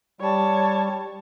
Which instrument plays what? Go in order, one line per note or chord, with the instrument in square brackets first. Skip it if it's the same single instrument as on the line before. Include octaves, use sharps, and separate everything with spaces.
[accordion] G3 [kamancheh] C#5 A5